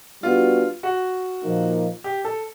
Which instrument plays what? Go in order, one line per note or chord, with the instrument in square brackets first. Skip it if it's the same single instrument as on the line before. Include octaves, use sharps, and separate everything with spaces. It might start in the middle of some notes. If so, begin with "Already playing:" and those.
[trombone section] G3 B3 D4 F#4 [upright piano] F4
[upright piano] F#4
[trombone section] A#2 F3 A#3 D#4
[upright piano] G4
A4